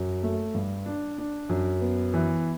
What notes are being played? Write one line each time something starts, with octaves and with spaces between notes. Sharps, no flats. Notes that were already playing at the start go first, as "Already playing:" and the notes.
Already playing: F#2
A3
G2
D4
D4
F#2
B3
E3